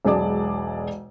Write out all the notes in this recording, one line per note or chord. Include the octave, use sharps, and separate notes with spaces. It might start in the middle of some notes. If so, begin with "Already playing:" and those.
E1 B1 G#3 G#4 D5 A5